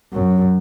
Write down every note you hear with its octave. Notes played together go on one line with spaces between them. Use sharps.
F#2